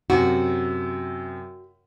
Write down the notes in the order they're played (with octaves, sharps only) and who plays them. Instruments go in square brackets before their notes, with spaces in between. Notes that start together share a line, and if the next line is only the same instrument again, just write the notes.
[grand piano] F#2 C3 [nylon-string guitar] F#4